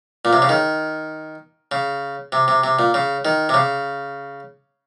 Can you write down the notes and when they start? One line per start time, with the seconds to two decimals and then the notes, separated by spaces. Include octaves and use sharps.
0.25 A#2
0.33 C3
0.42 C#3
0.49 D#3
1.72 C#3
2.32 C3
2.48 C3
2.64 C3
2.79 A#2
2.94 C#3
3.25 D#3
3.49 C3
3.54 C#3